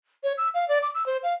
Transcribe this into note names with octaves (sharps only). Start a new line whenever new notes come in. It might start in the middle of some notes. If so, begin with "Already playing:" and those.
C#5
E6
F5
D5
D6
E6
C5
F5